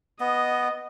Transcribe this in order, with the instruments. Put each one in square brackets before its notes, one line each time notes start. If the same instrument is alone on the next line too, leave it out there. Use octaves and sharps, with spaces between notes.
[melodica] B3 [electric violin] D#5